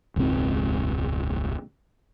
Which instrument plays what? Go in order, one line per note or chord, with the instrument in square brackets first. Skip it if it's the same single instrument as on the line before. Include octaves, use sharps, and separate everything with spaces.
[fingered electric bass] E1 C#2 G#2 C4